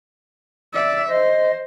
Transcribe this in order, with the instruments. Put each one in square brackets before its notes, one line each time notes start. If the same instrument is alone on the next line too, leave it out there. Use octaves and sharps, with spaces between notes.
[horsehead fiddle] D5 E5
[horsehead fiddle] C5 [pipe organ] D#5